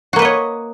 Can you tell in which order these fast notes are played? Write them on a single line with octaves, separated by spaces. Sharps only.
F#4 A#3 B4 D#5 C#5